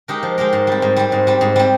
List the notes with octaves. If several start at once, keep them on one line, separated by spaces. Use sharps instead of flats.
G#3 D#4 G4 A#4
F3
G#3 D#4 G4 A#4
G#2
G3 C4
G#2
G3 C4
G#2
G3 C4
G#2
G3 C4